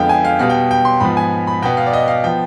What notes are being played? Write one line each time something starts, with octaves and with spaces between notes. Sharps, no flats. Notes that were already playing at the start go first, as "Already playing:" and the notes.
Already playing: F2 D3 G#3 B3 F5 G5
G#5
F5
B2 G3 B3 F5
G5
G5
C6
G#2 F3 B3 B5
G#5
B5
B2 B3 G5
F5
D5
D#5
F5
F3 B3 G5